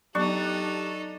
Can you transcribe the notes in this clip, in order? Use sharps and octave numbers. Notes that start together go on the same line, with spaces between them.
F#3 B3 D4 D#4 G4 A4 C#6